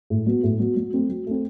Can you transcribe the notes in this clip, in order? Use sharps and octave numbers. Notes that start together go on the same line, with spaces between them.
A2
F#3 B3
A2
F#3 B3
F#3
A3 C4
F#3
A3 C4